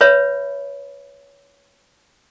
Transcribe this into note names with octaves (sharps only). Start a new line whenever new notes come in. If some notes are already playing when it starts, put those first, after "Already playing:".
B4 C#5 E5 B5